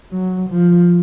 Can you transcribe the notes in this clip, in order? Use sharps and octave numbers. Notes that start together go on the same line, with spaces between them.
F#3
F3